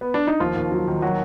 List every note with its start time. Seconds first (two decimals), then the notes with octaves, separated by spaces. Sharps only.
0.01 B3
0.14 D4
0.27 D#4
0.40 D#2 F3 F4
0.56 D#2
0.72 F#3
0.87 D#3
1.02 F#3 F#4